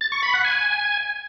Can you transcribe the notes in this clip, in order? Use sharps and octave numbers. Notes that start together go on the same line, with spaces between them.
A6
C#6
B5
F#5
G#5